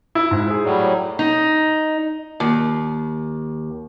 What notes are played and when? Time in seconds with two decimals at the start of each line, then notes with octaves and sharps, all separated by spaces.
0.15 E4
0.31 G#2 E4
0.46 G#4 C5
0.65 A2 F#3 G3
1.19 D#4
2.40 D#2